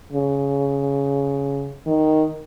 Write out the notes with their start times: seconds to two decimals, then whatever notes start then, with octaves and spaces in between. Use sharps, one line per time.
0.13 C#3
1.87 D#3